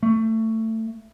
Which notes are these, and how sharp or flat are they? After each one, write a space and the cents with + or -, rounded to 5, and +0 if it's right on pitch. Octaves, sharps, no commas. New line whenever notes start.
A3 +20